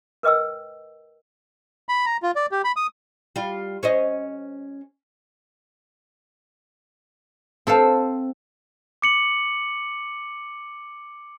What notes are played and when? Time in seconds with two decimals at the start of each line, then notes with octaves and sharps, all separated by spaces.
0.23 A#4 B4 D#5 G5 E6
1.89 B5
2.06 A#5
2.23 F4
2.36 D5
2.52 G4
2.64 B5
2.76 D#6
3.36 G3 F4
3.83 C#4 C5 D#5
7.67 C4 A4 C5 F5
9.02 D6 C#7 F#7